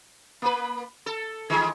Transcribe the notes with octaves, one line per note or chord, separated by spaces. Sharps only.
A#3 B4
A4
D#3 E3 G#3